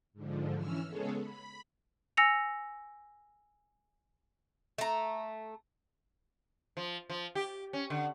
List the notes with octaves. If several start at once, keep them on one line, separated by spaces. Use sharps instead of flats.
G#2 D3 F3
E3 C#4 E6 F6
C#3 G#3 B3 G#4 A4 C#5
B5
G#5 E6 A#6 C#7 F7
A3 A#5
F3
F3
G4
C#4
D3